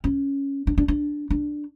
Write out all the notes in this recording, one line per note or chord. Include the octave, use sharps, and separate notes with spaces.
C#4
D4
D4
D4
D4